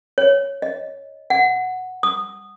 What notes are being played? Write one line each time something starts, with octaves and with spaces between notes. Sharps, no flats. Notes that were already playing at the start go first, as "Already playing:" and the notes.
C#5
D#5
F#5
D#6